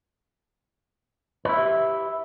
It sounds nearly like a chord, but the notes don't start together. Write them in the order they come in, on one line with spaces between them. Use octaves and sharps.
B4 E4 E5 G4